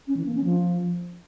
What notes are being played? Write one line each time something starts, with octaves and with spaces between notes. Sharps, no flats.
C#4
E3
A#3
C#4
F3